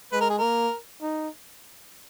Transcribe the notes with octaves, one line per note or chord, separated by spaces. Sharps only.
G#3 B4
A#4
G#4
A#3 A#4
D#4